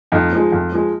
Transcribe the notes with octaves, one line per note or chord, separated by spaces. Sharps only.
F2 D#4
F3 G#3
F2
F3 G#3